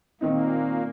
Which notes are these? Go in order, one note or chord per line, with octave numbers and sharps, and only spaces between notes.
A#2 D#3 A#3 C4 D#4